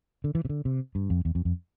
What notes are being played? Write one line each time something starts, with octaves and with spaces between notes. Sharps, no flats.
D3
E3
C3
D3
C3
G2
F2
E2
F2
F2